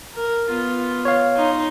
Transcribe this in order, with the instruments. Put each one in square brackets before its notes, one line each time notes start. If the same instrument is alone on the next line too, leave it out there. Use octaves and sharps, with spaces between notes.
[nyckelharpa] A#4
B3 F4
[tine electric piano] C#5 F5
[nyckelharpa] D#4 C6